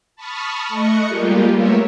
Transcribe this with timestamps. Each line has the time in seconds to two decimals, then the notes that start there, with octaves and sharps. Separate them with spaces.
0.16 A5 B5 C#6 D#6 F6
0.68 A3 D#5 C#6 F#6 C#7
1.08 G3 G#3 A#3 F4 G4
1.52 A3 B3 A#4 C#5 E5